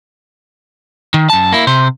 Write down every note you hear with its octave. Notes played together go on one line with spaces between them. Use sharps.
D#3
F#2 A5
A#3 E4
C3 C5